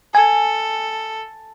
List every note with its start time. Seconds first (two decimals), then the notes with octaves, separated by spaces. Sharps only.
0.15 A4 G#5